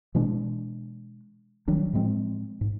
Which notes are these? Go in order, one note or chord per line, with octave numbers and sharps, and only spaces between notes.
B2 E3 G#3 D4
D#3 F#3 G3 D4
A2 F3 G#3 C4
G#2